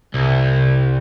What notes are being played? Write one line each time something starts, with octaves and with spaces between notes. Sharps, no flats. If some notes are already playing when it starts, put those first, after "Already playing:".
C2